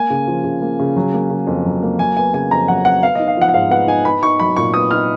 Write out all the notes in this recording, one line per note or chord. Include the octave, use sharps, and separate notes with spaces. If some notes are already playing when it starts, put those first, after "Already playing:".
Already playing: A#3 G#5
C#3
F3
C#3
A#3
C#3
F#3
A#3
C#3
F2
F#3
A#3
F#3 G#5
B3 G#5
C#3 G#5
F2 A#5
F#3 F#5
B3 F#5
B3 F5
D#4 D#5
F5
F3 F#5
F#5
G#2 F5
B3 F#5
D#4 G#5
B3 B5
D#4 C#6
F#3 B5
A#2 C#6
B3 D#6
D#4 F6